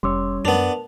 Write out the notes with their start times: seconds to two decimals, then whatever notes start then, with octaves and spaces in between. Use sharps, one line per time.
0.03 F1 G3 C#4 C#5 C6 D6 E6
0.45 F#2 B3 D4 A#4 A5 F7